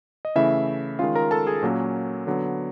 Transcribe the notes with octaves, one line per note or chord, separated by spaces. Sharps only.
D#5
C#3 E3 A3 E4 E5
D#3 G#3 C#4 F4 F5
A#4 A#5
A4 A5
G#4 G#5
A#2 F#3 A#3 C#4
D3 F#3 B3